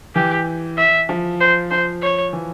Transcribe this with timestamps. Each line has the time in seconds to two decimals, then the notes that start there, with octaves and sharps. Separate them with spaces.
0.15 E3 G4
0.78 E5
1.09 F3
1.40 C5
1.71 F3 C5
2.02 C#5
2.33 E3